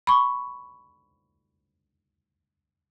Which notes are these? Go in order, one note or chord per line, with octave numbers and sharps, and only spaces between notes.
B5 C#6